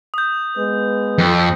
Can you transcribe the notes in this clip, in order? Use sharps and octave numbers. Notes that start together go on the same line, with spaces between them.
D#6 G6
G#3 B3 B4
F2